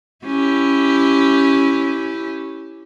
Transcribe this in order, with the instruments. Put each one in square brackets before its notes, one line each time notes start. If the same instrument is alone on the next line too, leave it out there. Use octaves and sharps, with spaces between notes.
[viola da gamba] C#4 E4 G4